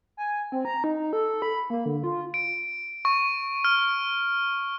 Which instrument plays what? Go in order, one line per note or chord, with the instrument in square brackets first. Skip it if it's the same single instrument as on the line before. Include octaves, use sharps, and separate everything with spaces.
[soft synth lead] G#5
C4
A#5
D#4
A4
B5
A#3
D3
F4
[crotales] D7
C#6
F6